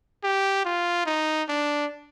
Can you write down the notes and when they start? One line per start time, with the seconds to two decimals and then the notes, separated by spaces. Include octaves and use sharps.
0.24 G4
0.64 F4
1.06 D#4
1.48 D4